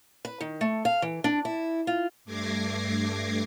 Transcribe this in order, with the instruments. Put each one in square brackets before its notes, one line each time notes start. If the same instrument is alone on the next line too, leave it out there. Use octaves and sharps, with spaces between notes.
[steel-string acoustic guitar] B4
D#3
A3
F5
E3
D4
E4
F4
[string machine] G2 A3 D6 G#6 A#6 C7